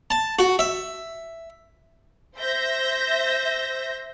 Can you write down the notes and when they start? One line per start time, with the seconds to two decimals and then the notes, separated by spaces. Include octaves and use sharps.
0.10 A5
0.39 F#4
0.59 E5
2.38 C5 E5 G6 A#6